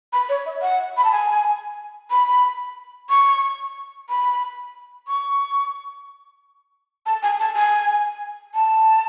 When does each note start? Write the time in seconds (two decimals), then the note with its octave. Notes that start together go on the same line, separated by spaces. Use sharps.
0.13 B5
0.29 C#5
0.46 E5
0.62 F#5
0.97 B5
1.04 A5
1.12 G#5
2.11 B5
3.10 C#6
4.09 B5
5.08 C#6
7.06 A5
7.23 G#5
7.40 A5
7.56 G#5
8.54 A5